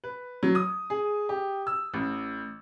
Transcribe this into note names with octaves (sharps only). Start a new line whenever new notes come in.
B4
F#3
D#6
G#4
G4
E6
A1